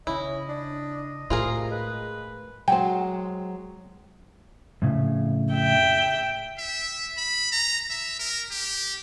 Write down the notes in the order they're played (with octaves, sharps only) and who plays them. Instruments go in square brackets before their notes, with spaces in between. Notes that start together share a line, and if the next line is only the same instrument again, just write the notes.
[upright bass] C#3 [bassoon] C#4 [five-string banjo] E4 [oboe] D#5
[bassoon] D4
[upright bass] A2 [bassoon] C3 [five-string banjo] F4 G#4 A#4
[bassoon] G#3 [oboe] B4
[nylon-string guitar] F#3 G#3 C5 [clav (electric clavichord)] G5
[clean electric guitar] F2 A2 C#3
[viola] E5 G5
[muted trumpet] E5
B5
A#5
E5
A#4
G4